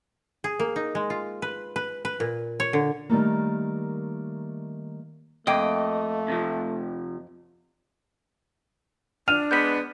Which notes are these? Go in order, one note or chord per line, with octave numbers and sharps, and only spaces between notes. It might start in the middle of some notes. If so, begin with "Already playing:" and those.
G#4
A#3
D#4
G#3
F4
B4
B4
B4
A#2
C#5
D3
D#3 G3 A3 A#3
F2 A3 A#3 D#5 G5
C3 F3
D4 F6 D#7 F7
G#3 B3 G6 B6